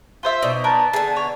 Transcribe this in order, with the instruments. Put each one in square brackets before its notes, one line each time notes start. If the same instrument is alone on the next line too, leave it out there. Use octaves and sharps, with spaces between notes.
[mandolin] F4 C5 E5
[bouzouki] B2 D#4 D5
[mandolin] A#4 B4 [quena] A5
[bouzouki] D3 B3 [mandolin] G#4 G#5
[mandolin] C#5